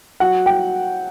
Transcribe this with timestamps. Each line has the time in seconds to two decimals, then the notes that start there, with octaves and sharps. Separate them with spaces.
0.20 F#3 F#5
0.46 G5